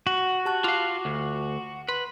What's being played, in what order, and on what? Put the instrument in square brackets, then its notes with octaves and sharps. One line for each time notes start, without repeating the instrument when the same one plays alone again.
[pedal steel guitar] F#4
[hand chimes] G4 A5 F#6
[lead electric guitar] F4 F5 [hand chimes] D6
[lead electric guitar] D2
[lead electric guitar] B4 [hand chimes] C6